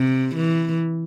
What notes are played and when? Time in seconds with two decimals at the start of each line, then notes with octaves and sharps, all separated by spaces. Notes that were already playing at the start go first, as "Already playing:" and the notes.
Already playing: C3
0.35 E3